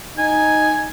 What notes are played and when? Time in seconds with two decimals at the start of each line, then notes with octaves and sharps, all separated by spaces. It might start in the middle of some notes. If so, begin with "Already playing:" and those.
0.18 D#4 G#5